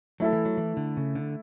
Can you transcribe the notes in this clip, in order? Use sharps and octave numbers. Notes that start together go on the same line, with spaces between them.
F#3 A3 E4 A4
E3
F#3
E3
D3
C#3
D3